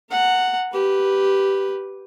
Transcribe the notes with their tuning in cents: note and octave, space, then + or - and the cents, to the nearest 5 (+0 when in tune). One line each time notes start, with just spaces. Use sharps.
F#5 +0 A#5 -35
G4 -5 B4 +0